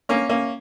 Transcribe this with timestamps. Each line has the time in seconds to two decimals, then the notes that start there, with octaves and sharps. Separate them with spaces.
0.09 A#3 C#4
0.29 A#3 C#4